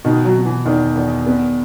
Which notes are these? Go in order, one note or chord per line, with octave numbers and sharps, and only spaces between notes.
B2 D#3
F#3
B2
E3
E2 D#3
E2
B3